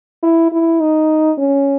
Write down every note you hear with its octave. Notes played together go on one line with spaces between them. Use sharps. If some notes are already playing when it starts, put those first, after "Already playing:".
E4
E4
D#4
C#4